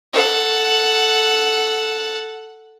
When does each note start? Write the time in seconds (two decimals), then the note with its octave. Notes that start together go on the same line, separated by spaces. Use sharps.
0.13 A4 F#5